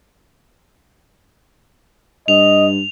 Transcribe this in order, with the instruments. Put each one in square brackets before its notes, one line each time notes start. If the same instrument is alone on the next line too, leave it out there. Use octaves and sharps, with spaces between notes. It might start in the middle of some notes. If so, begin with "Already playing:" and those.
[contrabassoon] G2 [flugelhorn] D#5 [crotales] F7